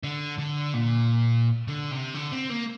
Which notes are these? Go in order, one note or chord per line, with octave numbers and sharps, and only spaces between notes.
D3
D3
A#2
D3
C3
D3
C4
A#3